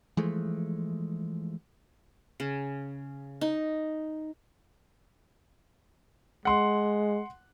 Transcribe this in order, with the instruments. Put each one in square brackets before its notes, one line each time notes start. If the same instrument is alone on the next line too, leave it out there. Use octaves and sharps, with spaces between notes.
[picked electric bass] E3 F3 G#3 A3
[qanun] C#3
D#4
[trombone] G#3 [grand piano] F#5 C6